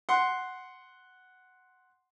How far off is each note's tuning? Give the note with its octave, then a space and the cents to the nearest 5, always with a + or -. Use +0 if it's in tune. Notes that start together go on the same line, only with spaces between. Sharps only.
F#5 +0 C6 +0